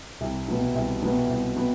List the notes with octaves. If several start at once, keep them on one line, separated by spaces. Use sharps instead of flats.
C2
B2 B3
C2
B2 B3
C2
B3